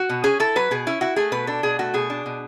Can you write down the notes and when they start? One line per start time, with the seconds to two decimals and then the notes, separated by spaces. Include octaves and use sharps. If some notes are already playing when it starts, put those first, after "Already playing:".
Already playing: F#4
0.09 B2
0.24 C#4 G#4
0.40 E4 A4
0.56 F#3 B4
0.71 B2 G#4
0.87 C#4 E4
1.01 E4 F#4
1.16 A3 G#4
1.32 B2 B4
1.47 D4 A4
1.63 B2 G#4
1.79 A3 F#4
1.94 B2 G#4
2.10 D4
2.26 B2